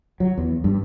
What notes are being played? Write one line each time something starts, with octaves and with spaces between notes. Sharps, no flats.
F#3
E2
G2